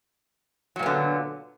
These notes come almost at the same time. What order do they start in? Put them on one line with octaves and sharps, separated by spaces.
F#3 A#2 B3 D3